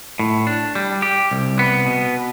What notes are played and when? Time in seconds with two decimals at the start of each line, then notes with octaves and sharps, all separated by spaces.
0.19 A2
0.47 D4
0.75 G3
1.02 G4
1.31 C2
1.59 B3
1.86 B2